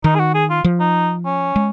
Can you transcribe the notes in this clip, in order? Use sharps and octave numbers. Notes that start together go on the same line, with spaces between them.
D#3 D#4
G#4
F#4
G#4
F4
F3
D#4
C#4
G#3